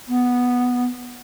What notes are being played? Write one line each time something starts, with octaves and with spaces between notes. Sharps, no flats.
B3